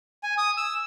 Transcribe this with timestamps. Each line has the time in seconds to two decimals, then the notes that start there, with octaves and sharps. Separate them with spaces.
0.23 G#5
0.38 D#6
0.57 E6